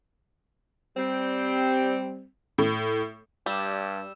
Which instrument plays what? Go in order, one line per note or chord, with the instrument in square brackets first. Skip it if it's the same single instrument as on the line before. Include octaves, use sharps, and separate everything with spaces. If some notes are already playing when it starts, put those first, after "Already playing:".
[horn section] G3 C4
[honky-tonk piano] A2
[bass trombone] G2 [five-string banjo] G3 [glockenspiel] E6 E7